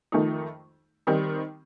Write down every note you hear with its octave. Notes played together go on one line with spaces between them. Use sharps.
F2 D#3 A3 D#4
D#3 G3 C4 D#4